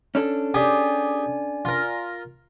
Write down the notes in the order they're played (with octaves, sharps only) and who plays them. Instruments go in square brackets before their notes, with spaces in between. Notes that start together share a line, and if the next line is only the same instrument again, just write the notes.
[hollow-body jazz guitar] C#4 D4 A4
[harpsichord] G4 G#4 [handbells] D5 G#5
[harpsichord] F4 A#4